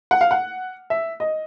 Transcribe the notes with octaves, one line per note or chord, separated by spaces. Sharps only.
F#5
F5
F#5
E5
D#5